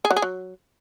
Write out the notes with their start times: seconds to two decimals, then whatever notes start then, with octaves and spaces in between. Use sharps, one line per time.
0.05 G#4
0.11 F#3
0.16 G#4
0.22 F#3